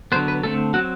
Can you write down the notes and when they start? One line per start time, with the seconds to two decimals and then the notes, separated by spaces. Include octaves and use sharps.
0.12 D3 F#3 B3 C5
0.28 B4
0.43 D3 A3 C4 A4
0.74 F#3 C4 F#4